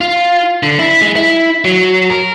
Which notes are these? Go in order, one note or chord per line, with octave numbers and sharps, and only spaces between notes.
F4
D3
E4
G#3
E4
F#3
A#4